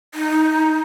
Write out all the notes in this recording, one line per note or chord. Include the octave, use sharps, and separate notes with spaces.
D#4